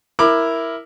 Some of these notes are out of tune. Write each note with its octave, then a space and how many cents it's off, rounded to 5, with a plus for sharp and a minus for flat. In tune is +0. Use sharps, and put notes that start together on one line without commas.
E4 +0 A#4 +0 D6 +20